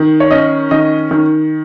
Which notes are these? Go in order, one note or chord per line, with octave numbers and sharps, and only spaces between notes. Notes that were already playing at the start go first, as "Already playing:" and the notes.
Already playing: D#3
C#5
C#4 D#5
D#3 D#5
D#3